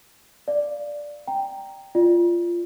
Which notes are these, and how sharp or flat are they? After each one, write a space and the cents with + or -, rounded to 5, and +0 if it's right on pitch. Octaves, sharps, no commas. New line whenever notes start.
D5 +0 F5 +0
G5 +0 A#5 +0
F4 -15 D5 +15